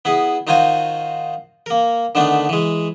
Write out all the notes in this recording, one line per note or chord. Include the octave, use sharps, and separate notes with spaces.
B3 E4 G#4
D#3 D#4 F4 F#4 C5 G#5
A#3 A#4
D3 D#3 A3 B3 D4
E3 G#3